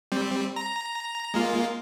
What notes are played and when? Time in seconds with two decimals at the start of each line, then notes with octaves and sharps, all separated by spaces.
0.12 G3 C4
0.56 A#5
1.34 G#3 A#3 F4